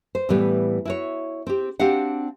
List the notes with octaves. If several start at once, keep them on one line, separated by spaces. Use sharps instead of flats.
C5
A2 E3 G3 B3
E4 F#4 C#5
C4 G4
C4 D4 F#4 G4 F5 F#5